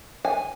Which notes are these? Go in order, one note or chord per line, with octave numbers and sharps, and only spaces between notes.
G#5